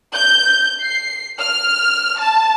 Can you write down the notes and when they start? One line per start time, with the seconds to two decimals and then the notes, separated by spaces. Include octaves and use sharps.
0.15 G6
0.82 C7
1.39 F6
2.20 A5